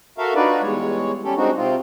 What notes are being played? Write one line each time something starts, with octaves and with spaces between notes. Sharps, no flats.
F#4 A4 A#4 E5 F5
D4 D#4 F4 F#4 B4 D5
E2 G3 G#3 C#5
G3 C#4 G4 A4
G#3 C4 D4 D#4 F#4
C3 C4 F4